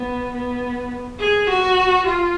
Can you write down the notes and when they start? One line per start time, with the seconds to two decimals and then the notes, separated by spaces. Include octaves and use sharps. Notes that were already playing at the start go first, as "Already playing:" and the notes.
Already playing: B3
0.35 B3
1.20 G#4
1.49 F#4
2.06 F4